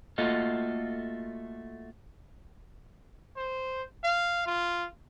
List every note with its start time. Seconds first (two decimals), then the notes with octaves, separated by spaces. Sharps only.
0.18 A3 A#3 F4 F#4 A4 D#5
3.36 C5
4.04 F5
4.46 F4